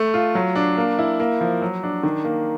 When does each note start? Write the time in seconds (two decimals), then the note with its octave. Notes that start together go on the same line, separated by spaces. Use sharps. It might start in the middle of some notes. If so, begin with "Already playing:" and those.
Already playing: A3
0.14 F4
0.35 F#3
0.55 D4
0.78 A#3
0.99 E4
1.20 A#3
1.41 F3
1.62 F#3
1.83 D4
2.03 D#3
2.24 A#3